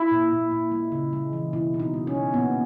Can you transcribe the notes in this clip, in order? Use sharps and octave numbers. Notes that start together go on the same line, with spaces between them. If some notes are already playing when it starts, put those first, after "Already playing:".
Already playing: E4
A#2
A#2
A#2
G#3
C#3
G#3
E3
B2 E4
B2
D#4
G#3
C#4
B2
A#2 B3